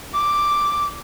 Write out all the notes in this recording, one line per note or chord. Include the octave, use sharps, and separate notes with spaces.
D6